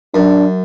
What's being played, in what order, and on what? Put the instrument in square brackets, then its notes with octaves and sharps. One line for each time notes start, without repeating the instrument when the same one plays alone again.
[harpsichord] F#2 [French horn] D4